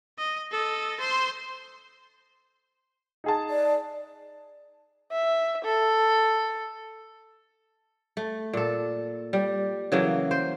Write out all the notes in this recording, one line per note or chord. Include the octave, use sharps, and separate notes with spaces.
D#5
A4 D#5
C5 C6
D#4 G#4 A5
D5
E5
A4
A3
A#2 A4
G3
C#3 E3 F#3 A#3
C5